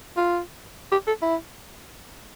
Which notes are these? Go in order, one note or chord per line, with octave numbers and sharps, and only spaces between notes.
F4
G4
A4
E4